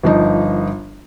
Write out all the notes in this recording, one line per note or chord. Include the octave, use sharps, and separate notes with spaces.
G1 F3 D#4